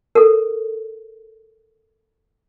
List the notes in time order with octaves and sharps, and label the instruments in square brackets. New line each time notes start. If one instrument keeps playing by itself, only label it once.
[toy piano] A4 A#4